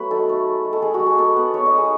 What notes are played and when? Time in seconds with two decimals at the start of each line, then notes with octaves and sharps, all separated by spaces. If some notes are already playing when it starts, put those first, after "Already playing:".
Already playing: F#3 A3 B3 B4
0.11 D#4 A4
0.29 A3
0.47 G#3
0.65 G#3
0.73 A4
0.82 G#3 G#4
0.94 F#4
1.00 G#3
1.06 G#4
1.18 B3 A4
1.36 B3 B4
1.54 D#4 C#5
1.66 D#5
1.71 D#4
1.78 G#4